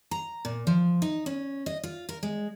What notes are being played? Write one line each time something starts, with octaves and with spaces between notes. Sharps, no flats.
A#5
A#2
F3
D#4
C#4
D#5
F4
A#4
G#3